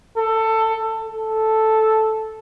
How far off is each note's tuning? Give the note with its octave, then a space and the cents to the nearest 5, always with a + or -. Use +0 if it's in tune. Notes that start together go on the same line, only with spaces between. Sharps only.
A4 +15
A4 -5